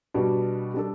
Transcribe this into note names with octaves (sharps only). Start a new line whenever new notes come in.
B2 G3 D4 F#4
G3 D4 A4